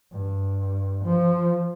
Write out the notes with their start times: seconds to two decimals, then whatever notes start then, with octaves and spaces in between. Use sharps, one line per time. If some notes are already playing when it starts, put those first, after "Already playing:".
0.12 G2
1.05 F3